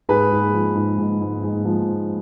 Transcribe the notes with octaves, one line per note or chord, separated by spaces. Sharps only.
G#2 G#4 B4
G#2
F3
G#2
G#2
G#2
G#2
F3